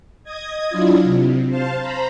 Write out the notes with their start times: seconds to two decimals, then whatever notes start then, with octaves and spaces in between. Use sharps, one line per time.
0.23 D#5 D#6 G#6
0.70 F#3 D4 E4 F4
1.04 C3
1.48 C5 F5 A5
1.78 C5 A#5 B5